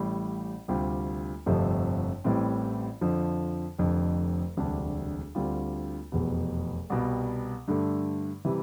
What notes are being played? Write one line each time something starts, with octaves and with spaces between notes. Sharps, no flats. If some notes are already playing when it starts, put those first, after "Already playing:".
Already playing: A1 A2 G3
D2 C3 G3 C4 F4
G1 F2 C3 F3 A3
A1 A2 E3 G3 C4
F2 D3 F3
F1 F2 D3
E1 D2 C3 G3 D4
D2 D3 G3 C4 F4
F1 E2 B2
C2 B2 G3
G2 D3 A3
C3 E3 G3